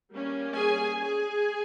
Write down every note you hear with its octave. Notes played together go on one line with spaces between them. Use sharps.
G3 A#3 C#4
G#4 G#5
G#4 G#5